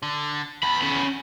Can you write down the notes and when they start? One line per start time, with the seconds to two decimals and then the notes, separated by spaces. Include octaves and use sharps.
0.03 D3
0.63 E2 B5
0.81 C#4 B5